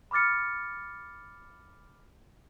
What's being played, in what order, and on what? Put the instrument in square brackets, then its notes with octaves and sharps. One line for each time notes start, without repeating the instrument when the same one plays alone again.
[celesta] B5 D6 F6 A6 C#7